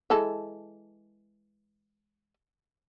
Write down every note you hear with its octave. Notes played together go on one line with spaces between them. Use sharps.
E3 G#3 A4